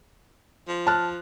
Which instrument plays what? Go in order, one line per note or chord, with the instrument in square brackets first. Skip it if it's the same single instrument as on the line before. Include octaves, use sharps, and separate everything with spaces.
[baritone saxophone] F3
[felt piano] A5 F6 F#6